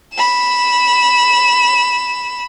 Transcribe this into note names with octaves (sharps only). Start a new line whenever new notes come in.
B5 E7